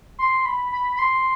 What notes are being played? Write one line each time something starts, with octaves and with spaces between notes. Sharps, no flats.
C6
B5
B5
B5
C6